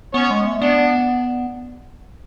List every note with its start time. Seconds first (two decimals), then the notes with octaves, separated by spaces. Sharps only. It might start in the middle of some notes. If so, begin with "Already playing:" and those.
0.14 B3 C#4 C#5
0.30 G#3
0.47 A3
0.62 B3 D4